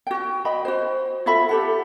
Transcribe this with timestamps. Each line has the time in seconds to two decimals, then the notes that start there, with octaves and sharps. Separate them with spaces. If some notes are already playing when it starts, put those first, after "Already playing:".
0.07 F#4 G5
0.45 D#5 G5 B5
0.65 F#4 C5
1.26 F4 A4 E5 B5
1.49 G4 A4 F#5